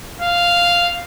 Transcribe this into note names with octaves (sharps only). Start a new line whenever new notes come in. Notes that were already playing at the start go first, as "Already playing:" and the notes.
F5